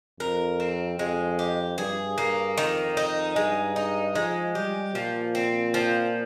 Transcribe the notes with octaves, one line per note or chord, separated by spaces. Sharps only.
F2 A#4
C4
F2 G#3
G4
G2 G#4
G2 A#3
F2 D#3
D#4
G2 G#3
D#4
F3 G#3
G3 G4
A#2 F3
C4
F3